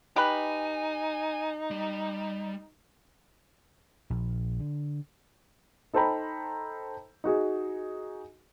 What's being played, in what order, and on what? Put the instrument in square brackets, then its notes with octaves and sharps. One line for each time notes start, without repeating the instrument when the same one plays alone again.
[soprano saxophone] D#4 [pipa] G4 B4 [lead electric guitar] G#5
[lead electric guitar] G3
[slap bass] A#1
D3
[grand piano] D#4 A4 C5 G5 A#5 B5
D#4 F#4 G#4